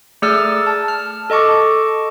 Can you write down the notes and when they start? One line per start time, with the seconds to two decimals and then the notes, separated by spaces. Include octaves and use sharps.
0.22 A3 G#4 D5 E6 F6 A6
0.67 A5
0.88 F6
1.30 A4 D#5 A5 C#6 D6